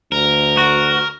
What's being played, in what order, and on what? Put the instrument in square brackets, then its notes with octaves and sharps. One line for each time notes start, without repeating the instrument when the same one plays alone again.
[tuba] D2 [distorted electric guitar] A#4
[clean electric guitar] F#4